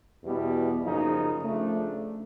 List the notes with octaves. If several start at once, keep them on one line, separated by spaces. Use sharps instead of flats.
E2 B2 G3 B3 E4
F#2 C#3 F3 A#3 D#4
C#3 F3 A3 D4